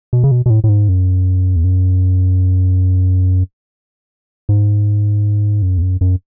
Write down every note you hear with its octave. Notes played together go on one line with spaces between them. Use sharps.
B2
C#3
B2
B2
A2
A2
G#2
F#2
E2
F#2
G#2
F#2
E2
F#2
F#2